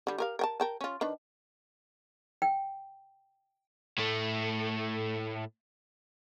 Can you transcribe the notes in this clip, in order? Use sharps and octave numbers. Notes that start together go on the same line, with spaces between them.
D3 G3
G4 A#4 F5
A#4 G5 A5
A#4 G5 A5
C#4 F4
D#3 D4 B4
G5
A2 A3